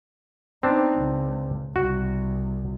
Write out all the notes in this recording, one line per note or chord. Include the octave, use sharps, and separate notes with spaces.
B3 C4 D4 D#4
C#2
C2 F#4